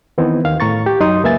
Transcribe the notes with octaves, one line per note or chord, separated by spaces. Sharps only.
D#3 E3 B3 C4 D#4 E4
D#2 D#3 F5
A2 A#5 C#6 A6
G4
F#2 F#3 D#4 F#4 C6 D#6
C#2 A#3 B4 E5 G#5 A6